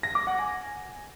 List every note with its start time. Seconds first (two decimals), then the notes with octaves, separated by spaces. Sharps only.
0.03 A#6
0.15 D6
0.27 F#5
0.39 G#5